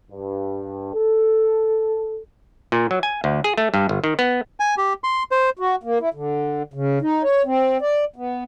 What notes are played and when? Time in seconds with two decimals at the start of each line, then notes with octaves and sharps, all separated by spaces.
0.11 G2
0.94 A4
2.72 A#2
2.91 F#3
3.03 G#5
3.24 D2
3.44 G#4
3.58 A3
3.74 G2
3.89 G1
4.04 D#3
4.19 B3
4.60 G#5
4.78 G4
5.04 C6
5.31 C5
5.59 F#4
5.84 A#3
6.01 E4
6.14 D3
6.74 C#3
7.02 D#4
7.23 C#5
7.45 C4
7.81 D5
8.16 B3